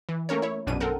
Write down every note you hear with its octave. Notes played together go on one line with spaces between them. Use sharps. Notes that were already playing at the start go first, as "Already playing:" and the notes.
E3
A3 A#3 C#4 A#4 C#5
E4 C#5
A#1 F#2 B2 C#4 D4 D#7
C4 A4 A#4 F#5